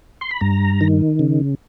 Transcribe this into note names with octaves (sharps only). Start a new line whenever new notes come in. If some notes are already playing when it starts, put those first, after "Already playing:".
C6
B5
G2 A#5
D#3
C#3